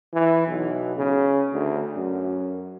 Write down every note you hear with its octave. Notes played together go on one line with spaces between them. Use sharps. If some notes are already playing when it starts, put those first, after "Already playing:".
E3
B1
C#3
D2
F#2